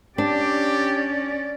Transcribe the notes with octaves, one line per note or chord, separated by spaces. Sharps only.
C#4 D4 G4 D5